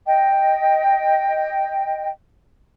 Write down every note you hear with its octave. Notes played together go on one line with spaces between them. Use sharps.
D#5 G5